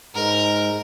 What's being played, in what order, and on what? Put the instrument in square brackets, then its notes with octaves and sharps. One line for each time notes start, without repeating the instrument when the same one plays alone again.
[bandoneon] G#2 [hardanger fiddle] A#4